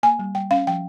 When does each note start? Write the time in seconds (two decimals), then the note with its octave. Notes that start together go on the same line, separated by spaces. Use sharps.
0.03 A#3 G#5
0.19 G3
0.35 G3 G5
0.51 C#4 F5
0.67 F3 G5